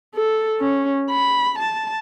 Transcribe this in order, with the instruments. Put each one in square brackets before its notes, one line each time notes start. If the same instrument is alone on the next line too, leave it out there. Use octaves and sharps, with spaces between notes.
[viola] A4
C#4
B5
A5